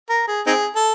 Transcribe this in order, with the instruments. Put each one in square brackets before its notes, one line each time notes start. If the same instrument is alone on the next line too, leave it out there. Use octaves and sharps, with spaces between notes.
[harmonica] A#4
G#4
C4 D#4 G#4
A4